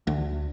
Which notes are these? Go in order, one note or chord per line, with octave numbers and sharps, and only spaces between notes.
D2